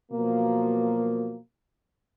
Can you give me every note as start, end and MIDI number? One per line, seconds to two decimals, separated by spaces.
0.12 1.37 47
0.12 1.37 53
0.12 1.37 54
0.12 1.37 58